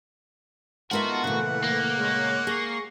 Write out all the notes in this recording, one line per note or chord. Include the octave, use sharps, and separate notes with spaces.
D#3 G#3 B3 D#4 F4 F#4 A4 E5
A#2 C#3 E3 A3 F#5
A#3
G#3 C#5
G#4 C#6 A#6 C7